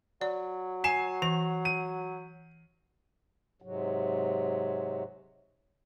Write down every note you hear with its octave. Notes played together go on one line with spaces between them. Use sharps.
F#3 D5
G#5 C7 E7
E3 F7
D#7
G#2 C3 F#3